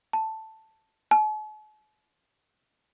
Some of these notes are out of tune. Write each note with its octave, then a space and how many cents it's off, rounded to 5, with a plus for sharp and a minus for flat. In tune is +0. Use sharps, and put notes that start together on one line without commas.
A5 +5
A5 -45